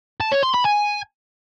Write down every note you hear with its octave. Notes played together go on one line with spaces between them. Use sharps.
A5
C#5
C6
B5
G#5